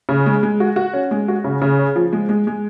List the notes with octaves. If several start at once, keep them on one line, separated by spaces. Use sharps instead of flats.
C#3
G#3
G#3
F#4
F#4
C#4
G#3
F#4
C#3
C#3
C#4
F3
G#3
G#3
G#3